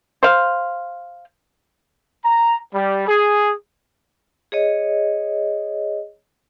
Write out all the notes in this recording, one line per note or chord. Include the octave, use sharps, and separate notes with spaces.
C5 F5
A#5
G3
G#4
G#4 C#5 D#5